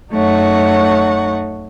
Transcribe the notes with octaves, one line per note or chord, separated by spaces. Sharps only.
F#2 A3 D#4 C#5 F#5 C#6